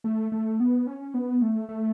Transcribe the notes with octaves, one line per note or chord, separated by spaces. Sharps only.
A3
A3
B3
C#4
B3
A3
A3